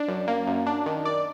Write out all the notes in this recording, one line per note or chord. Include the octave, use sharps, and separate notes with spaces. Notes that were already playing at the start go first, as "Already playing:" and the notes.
Already playing: D4
F#2
A#3
F#2
D4
D#3
D5